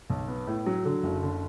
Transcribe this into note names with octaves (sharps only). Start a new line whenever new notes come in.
B1
B3
A2
F#3
D3
F#1
D3